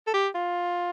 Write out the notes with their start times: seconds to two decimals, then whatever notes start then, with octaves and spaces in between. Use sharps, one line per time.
0.07 A4
0.13 G4
0.35 F4